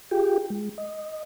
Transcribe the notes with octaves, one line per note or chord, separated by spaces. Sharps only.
F4 G4 G#4 G5
G#3
D#5